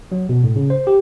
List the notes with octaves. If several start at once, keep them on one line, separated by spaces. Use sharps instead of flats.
F#3
B2
A2
C#3
C5
G4